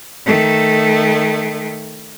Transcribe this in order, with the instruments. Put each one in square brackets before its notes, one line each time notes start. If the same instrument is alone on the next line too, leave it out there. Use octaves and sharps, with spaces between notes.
[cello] D#3 A3